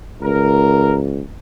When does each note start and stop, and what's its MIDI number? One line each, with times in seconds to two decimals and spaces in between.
0.22 1.21 37
0.22 0.95 70